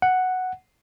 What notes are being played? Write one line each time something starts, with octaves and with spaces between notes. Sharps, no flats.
F#5